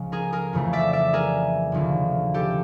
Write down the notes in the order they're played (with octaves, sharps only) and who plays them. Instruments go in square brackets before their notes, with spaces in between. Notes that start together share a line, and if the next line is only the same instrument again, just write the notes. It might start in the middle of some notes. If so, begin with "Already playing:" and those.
Already playing: [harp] C#2 C#3 F3 G#3
G#4 A#4
G#4 A#4
F2 C#3 E3 A3
D5 E5
D5 E5
G#4 A#4
F1 D#2 D3 F3
G4 A4